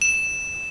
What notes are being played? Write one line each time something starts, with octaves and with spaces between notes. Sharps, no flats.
E7